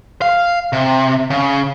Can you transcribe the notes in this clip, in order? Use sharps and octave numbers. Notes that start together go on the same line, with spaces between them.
F5
C3
C#3